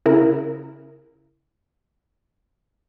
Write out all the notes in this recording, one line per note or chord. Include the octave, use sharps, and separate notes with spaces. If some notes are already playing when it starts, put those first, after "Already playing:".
C#3 E4 A#4